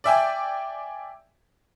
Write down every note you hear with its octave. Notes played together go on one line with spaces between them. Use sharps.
D5 E5 G5 G#5